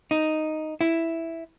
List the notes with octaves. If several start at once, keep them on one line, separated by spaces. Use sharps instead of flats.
D#4
E4